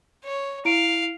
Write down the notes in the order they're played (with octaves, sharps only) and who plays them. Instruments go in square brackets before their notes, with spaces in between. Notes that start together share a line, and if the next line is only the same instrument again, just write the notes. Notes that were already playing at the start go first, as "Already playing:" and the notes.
[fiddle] C#5
[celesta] E4 D7 [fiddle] F5